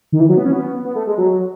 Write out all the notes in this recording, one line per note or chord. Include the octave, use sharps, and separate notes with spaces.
D#3
E3
F#3
B3
C#4
B3
B3
A3
G#3
F#3